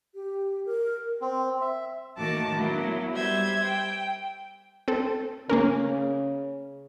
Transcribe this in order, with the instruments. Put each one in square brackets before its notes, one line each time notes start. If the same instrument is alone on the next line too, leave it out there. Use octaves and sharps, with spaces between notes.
[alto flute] G4
A#4
[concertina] C4
E5
[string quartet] A2 D#3 A#3 F#4 A5 D6
F#3 A#3 B3 D4 E4
G3 C5 E5 G#6
G5
[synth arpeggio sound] C4 A4
[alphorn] C#3 [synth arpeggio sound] A#3 C#4 A#4